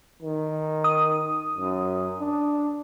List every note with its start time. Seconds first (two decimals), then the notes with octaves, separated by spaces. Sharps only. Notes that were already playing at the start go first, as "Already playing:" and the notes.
0.22 D#3
0.84 D#6
1.57 F#2
2.19 D4